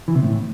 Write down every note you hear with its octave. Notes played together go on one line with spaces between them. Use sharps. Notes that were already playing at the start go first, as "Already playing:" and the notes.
E3
C3
A2